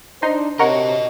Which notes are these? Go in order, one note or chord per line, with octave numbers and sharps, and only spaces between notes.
D4 D#4 C5 C6
C3 F#4 A#4 C#5 D#5 F#5